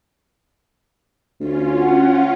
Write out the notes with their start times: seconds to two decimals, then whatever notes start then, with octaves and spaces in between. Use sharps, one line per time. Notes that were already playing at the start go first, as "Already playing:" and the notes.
1.40 D2 C#4 F4
1.79 F#5